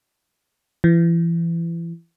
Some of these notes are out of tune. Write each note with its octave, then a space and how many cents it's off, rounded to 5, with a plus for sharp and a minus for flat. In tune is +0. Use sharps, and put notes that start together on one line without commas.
E3 +30